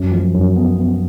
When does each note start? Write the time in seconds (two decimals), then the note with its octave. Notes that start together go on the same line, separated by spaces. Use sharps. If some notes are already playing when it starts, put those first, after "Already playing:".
Already playing: F#2
0.11 F3
0.34 F#2
0.56 B3
0.78 B3